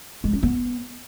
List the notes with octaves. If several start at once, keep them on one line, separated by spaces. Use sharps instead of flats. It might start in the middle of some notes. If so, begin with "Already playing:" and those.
G#3
C#4
B3